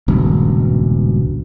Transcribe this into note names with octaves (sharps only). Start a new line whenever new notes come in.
D#1 C#2 G2 B2